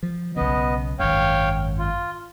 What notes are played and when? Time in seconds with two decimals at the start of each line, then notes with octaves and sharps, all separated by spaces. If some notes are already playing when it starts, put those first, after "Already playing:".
0.03 F3
0.36 B1 C#3 B3 D#5
0.99 G#1 F#2 C#5 F5 G5
1.79 F4